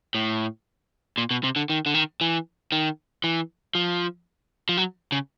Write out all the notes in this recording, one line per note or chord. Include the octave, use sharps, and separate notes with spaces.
A2
A#2
B2
C3
D3
D#3
D3
D#3
E3
D#3
E3
F3
F3
F#3
C#3